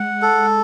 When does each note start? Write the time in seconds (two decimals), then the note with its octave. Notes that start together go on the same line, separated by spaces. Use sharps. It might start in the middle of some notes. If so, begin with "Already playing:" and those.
Already playing: G#3 F#5
0.22 A4